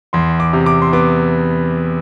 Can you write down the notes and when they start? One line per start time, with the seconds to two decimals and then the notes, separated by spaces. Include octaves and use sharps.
0.13 E2 C6
0.40 D6
0.53 C3
0.66 D6
0.82 C6
0.93 B3 D6